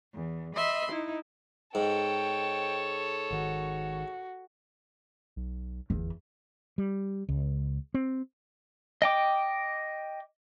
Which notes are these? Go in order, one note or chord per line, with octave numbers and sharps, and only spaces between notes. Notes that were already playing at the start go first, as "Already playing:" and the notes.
E2
D#5 E5 B5 C6
D#4 E4
G#2 A4 C#5 G5
G#1 D#3 F#4
B1
G1 E2
G3
C#2
C4
D#5 G5 D6